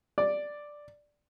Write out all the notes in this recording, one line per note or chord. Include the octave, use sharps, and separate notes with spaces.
D5